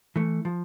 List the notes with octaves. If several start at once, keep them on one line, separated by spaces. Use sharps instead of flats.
E3 A3
F3